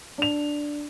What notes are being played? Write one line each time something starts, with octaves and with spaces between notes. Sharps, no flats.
D4 F7